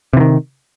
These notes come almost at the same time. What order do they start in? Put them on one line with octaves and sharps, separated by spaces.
C3 E3 D#3